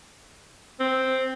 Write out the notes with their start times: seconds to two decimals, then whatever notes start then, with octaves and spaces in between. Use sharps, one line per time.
0.80 C4